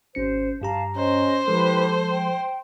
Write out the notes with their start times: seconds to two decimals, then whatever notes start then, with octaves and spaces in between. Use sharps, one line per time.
0.15 G#1 C#4 C5 C#7
0.62 G2 G4 F5 A5 A#5
0.96 C#4 C5 D#5
1.48 F3 G#3 E4 G4 A4 B4
2.09 G5